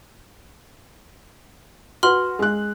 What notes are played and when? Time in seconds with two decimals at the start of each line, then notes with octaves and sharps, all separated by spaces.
2.03 F#4 B4 C6 F6 F#7
2.39 G#3 F#6